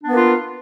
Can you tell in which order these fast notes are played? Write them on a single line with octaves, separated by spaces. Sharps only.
D4 B3 B4 A#3 F4